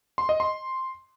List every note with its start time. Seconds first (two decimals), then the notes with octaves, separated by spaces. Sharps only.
0.18 C6
0.29 D#5
0.40 C6